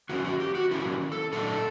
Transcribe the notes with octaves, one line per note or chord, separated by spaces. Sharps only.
D#3 F#3 A#3 C#4 F#4
F#4
G4
F#4
D#3 F#3 A#3 C#4 E4
A4
A#2 F#3 A3 D4 A4